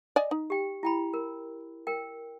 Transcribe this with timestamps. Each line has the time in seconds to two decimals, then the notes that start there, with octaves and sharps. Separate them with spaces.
0.16 D5 D#5 G#5
0.31 D#4
0.50 G4 G5
0.83 E4 G5 B5
1.14 A#4
1.87 A#4 G5